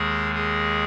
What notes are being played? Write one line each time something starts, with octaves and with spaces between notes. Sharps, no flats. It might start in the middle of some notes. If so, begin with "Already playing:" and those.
Already playing: D#2 D#3 G#3 G#4
G#4